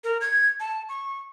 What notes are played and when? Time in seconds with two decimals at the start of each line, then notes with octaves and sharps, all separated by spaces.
0.04 A#4
0.21 G#6
0.60 A5
0.89 C#6